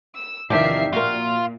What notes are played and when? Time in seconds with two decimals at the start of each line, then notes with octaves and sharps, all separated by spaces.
0.15 E6
0.50 E2 C3 D#3 F3 D4 G4 E5 C7
0.94 A#2 F4 F#4 A#4